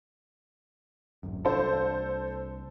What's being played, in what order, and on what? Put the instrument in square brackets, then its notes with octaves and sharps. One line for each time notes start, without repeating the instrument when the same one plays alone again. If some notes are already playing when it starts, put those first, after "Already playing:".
[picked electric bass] D1 G#1 F#2
[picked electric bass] C2 D4 [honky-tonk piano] A4 C5